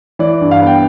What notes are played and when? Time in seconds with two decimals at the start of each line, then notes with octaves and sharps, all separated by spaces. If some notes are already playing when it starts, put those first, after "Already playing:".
0.19 E3 D5
0.41 G2
0.51 F5
0.61 B3
0.67 G5